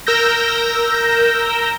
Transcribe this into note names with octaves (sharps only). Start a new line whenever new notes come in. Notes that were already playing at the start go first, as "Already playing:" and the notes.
A#4 E6 G6 A#6